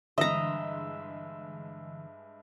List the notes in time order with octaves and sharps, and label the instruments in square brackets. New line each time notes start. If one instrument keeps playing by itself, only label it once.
[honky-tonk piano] G2 G#3 [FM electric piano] D3 E3 [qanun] D#5 A#5 [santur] E5